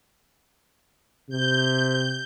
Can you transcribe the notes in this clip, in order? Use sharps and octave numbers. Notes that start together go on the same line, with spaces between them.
C3 G6